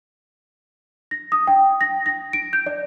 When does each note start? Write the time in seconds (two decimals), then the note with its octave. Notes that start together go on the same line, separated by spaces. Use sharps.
1.11 A#6
1.32 D#6
1.47 G5
1.81 A#6
2.06 A#6
2.33 D7
2.53 G6
2.66 D5